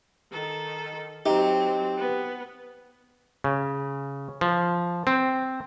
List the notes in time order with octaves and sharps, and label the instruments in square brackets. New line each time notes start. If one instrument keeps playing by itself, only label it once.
[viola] D#3 A4
[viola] F#3 C4 [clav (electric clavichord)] D#4 [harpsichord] G4
[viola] B3
[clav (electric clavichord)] C#3
F3
C4